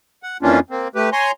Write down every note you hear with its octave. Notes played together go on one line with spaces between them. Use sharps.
F#5
F2 E3 A#3 C#4 D4 F4
A#3 C4
A3 G4 B4
C#5 G#5 A#5 C6